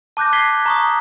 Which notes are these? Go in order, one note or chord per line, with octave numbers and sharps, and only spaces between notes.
A5 D6 F#6 G6 A#6
G6 G#6 B6 C7 G7
A#5 C#6 D#6